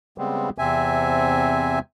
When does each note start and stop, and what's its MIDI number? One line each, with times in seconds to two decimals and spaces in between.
0.18 0.50 49
0.18 0.50 55
0.18 0.50 56
0.18 0.50 59
0.18 0.50 60
0.58 1.79 40
0.58 1.79 48
0.58 1.79 60
0.58 1.79 76
0.58 1.79 80